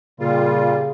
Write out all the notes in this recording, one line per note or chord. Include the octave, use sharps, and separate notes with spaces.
A#2 C#3 G3 F4